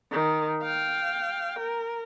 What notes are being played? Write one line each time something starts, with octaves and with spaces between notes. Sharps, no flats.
D#3
F5 G5
A#4